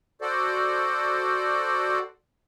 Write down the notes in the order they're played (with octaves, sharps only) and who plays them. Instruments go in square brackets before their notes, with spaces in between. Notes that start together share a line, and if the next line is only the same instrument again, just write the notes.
[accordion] F#4 A4 C5 D5